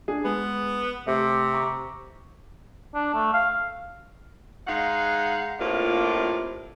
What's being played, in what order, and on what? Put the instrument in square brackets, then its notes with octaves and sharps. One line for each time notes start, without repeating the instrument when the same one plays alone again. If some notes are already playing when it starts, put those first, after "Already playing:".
[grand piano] D4 G#4
[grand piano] G#3 [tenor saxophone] B3
[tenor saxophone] C3 [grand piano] A3
[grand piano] A#5 C#6 D6
[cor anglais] D4
A3
F5
[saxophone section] G#3 D#4 F5 F#5
F2 A2 C3 A#3 D4 F4